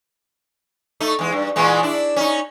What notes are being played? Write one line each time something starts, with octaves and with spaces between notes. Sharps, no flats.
A3 D#4
E2 G#3
G2
A#2 E3 G#3
D4 E4
C#4 D#4